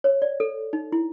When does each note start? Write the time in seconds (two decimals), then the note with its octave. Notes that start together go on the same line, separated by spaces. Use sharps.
0.04 C#5
0.22 D5
0.40 A4
0.73 D#4
0.92 E4